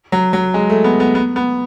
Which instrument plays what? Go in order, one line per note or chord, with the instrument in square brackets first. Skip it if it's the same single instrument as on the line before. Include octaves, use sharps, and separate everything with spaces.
[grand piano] F#3
F#3
G#3
A3
B3
B3
B3
B3